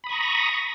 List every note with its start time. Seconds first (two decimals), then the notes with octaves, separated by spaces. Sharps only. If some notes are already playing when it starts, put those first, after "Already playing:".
0.04 B5
0.07 D#6
0.09 C#6
0.12 A#5